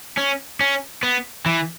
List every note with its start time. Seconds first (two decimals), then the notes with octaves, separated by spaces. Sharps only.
0.18 C#4
0.60 C#4
1.03 B3
1.46 E3